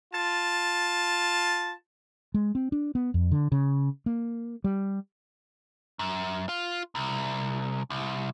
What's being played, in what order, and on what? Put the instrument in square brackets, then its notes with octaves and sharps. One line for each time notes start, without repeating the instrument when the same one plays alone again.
[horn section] F4 A5
[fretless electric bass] G#3
C4
D4
B3
F2
D3
C#3
A#3
G3
[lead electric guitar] F#2
F4
C2
C2